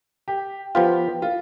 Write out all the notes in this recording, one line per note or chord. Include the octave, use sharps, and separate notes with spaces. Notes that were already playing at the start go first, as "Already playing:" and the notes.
G4
F3 B3 F4 G4
F4